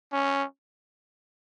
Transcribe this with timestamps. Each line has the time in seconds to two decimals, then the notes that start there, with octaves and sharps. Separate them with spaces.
0.13 C#4